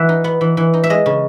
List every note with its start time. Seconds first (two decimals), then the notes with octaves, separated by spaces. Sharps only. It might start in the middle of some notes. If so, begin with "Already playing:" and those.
Already playing: E3 E5 F#5
0.09 D#4
0.24 B3
0.41 E3
0.57 E3
0.74 D#4
0.83 E5
0.90 G#3 D#5
1.06 C#3